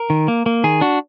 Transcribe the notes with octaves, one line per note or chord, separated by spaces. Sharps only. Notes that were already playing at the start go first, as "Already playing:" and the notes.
Already playing: A#4
D#3
A#3
A#3
D#3 G#4
D4 F#4